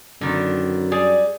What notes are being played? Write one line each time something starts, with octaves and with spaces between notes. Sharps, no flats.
F#2 D3 D#3 B3
G3 G#4 D5